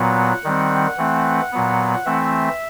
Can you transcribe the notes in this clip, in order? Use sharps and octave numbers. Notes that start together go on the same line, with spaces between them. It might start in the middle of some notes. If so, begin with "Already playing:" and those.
Already playing: A#2 F#3 B3 F#5
D#3 G3 C4
E3 A3 C4
A#2 F#3 B3
E3 A3 C4 E5